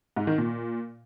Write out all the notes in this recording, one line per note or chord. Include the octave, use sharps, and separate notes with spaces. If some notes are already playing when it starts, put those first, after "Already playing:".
G#2
D#3
A#2